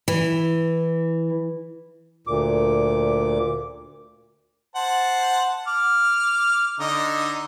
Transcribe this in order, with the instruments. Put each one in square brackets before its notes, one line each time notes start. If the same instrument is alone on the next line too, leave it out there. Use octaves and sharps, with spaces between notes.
[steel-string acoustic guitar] E3
[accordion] D2 A#2 D6
[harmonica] C5 F#5 A5
D6 F6
D3 D#4 D#5